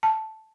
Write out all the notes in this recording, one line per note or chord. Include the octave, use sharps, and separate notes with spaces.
A5